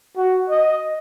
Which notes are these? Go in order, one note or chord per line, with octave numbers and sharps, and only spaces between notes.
F#4
D#5